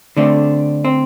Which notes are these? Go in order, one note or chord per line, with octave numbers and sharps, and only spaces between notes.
D3 A3 C4 D4
C4